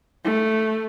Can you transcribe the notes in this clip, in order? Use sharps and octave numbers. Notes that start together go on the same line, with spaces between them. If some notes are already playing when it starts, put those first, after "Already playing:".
A3